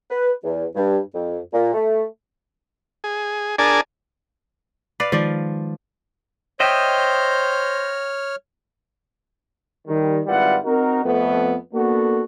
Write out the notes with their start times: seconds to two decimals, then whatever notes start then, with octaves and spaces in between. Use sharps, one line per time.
0.11 B4
0.44 E2
0.76 G2
1.14 F2
1.54 A#2
1.74 A3
3.04 G#4
3.58 D4 G#4 A#4 D5 G#5 A5
5.00 B4 D5 F5
5.12 D#3 F3 G#3 D5
6.60 C5 C#5 D#5 E5 G5 F6
9.87 D#3 G3
10.27 G#1 G3 E4 F4 B4 F#5
10.64 C4 D#4 F#4 A#4
11.04 F2 A3 B3
11.74 A#3 B3 D4 F#4 A4